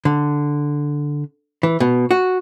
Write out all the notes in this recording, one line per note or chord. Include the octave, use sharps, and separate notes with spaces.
D3
E3
B2
F#4